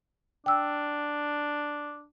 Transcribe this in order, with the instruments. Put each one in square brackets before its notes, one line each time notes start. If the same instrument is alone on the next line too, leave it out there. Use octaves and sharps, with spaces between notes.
[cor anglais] D4 [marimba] G5 E6